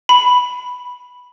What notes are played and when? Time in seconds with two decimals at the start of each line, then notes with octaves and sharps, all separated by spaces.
0.09 B5